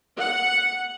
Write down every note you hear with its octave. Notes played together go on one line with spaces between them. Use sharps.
F#5